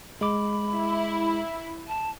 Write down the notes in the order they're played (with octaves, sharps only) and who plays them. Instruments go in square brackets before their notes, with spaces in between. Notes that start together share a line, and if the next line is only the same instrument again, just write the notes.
[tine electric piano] G#3 D6 [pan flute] B5
[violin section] E4
[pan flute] A5